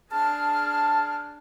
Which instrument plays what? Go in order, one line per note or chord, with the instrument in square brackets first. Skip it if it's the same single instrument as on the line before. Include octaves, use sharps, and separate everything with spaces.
[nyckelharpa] D4 G#4 [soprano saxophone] A5 [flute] F6